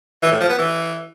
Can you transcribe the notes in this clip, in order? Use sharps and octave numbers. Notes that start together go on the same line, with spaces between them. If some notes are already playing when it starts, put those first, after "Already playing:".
E3
A2
F3
B3
E3